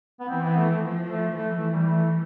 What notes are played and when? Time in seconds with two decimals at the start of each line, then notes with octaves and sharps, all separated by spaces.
0.20 B3
0.28 E3 C4
0.42 B3
0.56 A3
0.69 A3
0.83 F3
1.09 A3
1.36 E3 A3
1.54 A3
1.73 G3
1.89 A3